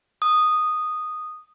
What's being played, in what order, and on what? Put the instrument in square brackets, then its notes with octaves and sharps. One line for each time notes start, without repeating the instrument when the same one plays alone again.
[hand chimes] D#6